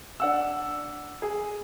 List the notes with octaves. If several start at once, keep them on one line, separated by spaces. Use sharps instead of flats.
D4 F#5 E6
G#4